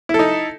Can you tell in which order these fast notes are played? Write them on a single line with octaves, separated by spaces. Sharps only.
E4 A4 D#4